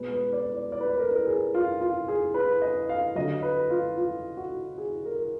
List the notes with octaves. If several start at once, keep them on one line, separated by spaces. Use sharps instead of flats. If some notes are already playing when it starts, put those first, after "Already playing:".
Already playing: B2 G#3 B4
B4
D5
D5
D5
B4
D5
A#4
B4
A#4
G#4
F4
F4
G#4
B4
D#5
F5
D3 F#3 D#5
B4
F4
F4
F#4
G#4
A#4